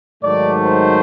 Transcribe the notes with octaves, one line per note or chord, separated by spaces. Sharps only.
G#2 D#3 F#3 A3 D5
C5